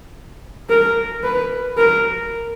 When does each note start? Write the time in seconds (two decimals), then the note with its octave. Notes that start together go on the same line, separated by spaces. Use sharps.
0.69 A#4
1.24 B4
1.78 A#4